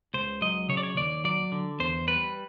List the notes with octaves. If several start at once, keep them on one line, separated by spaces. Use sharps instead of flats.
C#2 C5
F#3 D#5
C#3 C#5
D5
C#5
D#2 D5
F#3 D5
D3
E2 C5
G3 B4